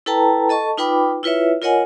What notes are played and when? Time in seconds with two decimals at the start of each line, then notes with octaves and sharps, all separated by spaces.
0.06 E4 A4 B4 G5 A5 A#5
0.49 A4 D#5 A5 C#6
0.78 D#4 F4 B4 G5 B5 D6
1.23 E4 F4 B4 C#5 E5
1.62 F4 A#4 C#5 D#5 F#5 G#5